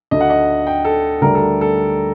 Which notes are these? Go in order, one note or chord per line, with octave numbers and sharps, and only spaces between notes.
D2 D3 A3 D#5
F#5
D#5
G5
A4
D2 D3 G3 A#4
A4
A4